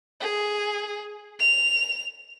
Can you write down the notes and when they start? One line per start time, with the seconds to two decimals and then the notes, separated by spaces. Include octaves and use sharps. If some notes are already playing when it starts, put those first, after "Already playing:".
0.20 G#4
1.39 F7